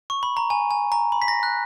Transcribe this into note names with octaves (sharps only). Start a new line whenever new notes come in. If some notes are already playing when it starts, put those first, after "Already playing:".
C#6
B5
A#5
G#5
G#5
A#5
B5
B6
A#6
F#6